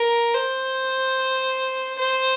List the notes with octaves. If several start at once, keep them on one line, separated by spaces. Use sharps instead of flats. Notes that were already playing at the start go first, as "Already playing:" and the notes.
Already playing: A#4
C5
C5